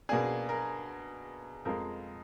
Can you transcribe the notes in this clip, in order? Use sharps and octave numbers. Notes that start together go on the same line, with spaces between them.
B2 A#3 D4 G#4
A#4
F2 F3 G#3 A#4